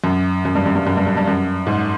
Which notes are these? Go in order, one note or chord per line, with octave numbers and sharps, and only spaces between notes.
F#2
F#2
G2
F#2
G2
F#2
G2
F#2
G2
F#2
G#2